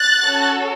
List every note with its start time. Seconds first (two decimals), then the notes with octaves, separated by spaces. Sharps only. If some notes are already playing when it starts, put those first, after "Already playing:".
Already playing: F#6 A6
0.21 C#4 F#4 A4